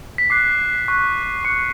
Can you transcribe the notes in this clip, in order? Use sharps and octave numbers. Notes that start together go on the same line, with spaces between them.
B6
D6 F#6 C7
C#6 F#6
C#6 F#6 C#7